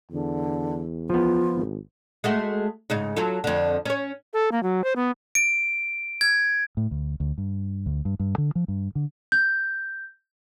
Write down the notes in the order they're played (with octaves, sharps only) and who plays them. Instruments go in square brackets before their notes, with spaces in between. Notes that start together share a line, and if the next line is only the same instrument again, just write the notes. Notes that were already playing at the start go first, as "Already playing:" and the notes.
[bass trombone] E2 [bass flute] D3
[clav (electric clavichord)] F3 B3 [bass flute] F4
[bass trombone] G#1
[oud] G#3 A3 F#4
G#2 C#3 D#4
F#3 F4 A4
F2 D3
C#4 C#5
[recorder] A4
A#3
F#3
C5
B3
[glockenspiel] D7
G#6
[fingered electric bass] A2
D2
D2
G2
D2
G2
G2
D3
F3
G2
D3
[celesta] G6